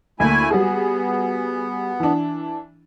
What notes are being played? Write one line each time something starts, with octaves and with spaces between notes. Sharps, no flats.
D2 A3 A#3 E4 G#5
G3 B3 F#4 G#4
E3 D4